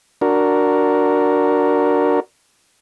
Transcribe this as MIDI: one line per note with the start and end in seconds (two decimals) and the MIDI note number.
0.21 2.20 62
0.21 2.20 66
0.21 2.20 70